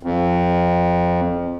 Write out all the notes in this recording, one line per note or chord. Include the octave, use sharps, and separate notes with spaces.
F2